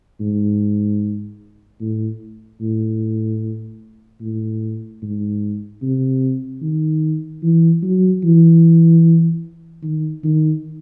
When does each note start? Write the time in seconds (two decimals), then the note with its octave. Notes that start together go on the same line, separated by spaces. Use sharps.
0.20 G#2
1.81 A2
2.61 A2
4.21 A2
5.02 G#2
5.82 C3
6.62 D#3
7.43 E3
7.82 F#3
8.23 E3
9.83 D#3
10.24 D#3